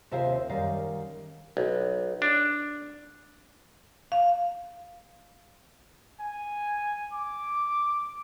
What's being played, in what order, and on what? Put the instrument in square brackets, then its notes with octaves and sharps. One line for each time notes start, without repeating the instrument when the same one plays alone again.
[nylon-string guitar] D#2 C3 F4 C5 E5 F5
F#2 D#3 G3 F5
[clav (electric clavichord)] B1
D4
[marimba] F5
[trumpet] G#5
D6